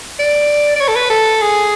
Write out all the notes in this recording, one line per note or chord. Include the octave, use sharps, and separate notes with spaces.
D5
D5
C#5
A4
B4
A4
G#4